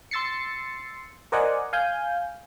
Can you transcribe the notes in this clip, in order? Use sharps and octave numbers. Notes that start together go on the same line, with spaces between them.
C6 E6 A6 C7 C#7
A#4 C5 D5 D#5 F#5 G#5
F5 G#5 G6